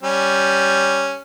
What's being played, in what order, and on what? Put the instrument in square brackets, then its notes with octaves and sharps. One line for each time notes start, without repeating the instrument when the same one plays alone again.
[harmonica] G3 C#4